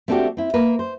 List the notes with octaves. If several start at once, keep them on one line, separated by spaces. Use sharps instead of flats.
A3 C4 D4 D#4 F#4 G4
C4 E4
A#3 A#4 B4
C5